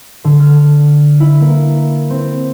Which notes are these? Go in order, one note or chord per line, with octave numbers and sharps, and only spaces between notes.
D3
F6
E4
A#3
C4